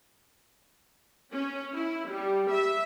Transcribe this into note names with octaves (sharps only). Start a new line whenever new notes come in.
C#4
E4
G3
E5